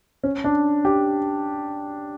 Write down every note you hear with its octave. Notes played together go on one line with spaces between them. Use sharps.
C#4
D4
G4